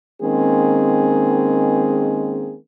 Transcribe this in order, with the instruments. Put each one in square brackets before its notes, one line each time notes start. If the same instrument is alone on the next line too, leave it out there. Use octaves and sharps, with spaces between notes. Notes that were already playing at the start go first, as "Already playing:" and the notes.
[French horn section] D#3 G#3 A#3 C4 C#4 G#4